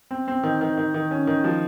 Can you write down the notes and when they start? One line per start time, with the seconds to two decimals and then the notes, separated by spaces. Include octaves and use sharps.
0.11 C4
0.28 C4
0.43 D#3
0.61 D#3
0.77 D#3
0.94 D#3
1.11 C#4
1.27 D#3
1.44 F3